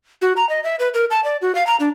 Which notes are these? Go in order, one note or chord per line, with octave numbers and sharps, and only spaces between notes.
F#4
A#5
D#5
E5
B4
A#4
A5
D5
F#4
F5
A#5
D4